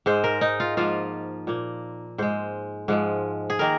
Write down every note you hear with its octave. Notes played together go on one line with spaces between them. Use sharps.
G#2 G#3 C5
A#4
D#4
F4
G#2 F3 A#3 F4
A#2 A#3
G#2 G#3 C5
G#2 F3 G#3
G#4
D#3 A#3 A#4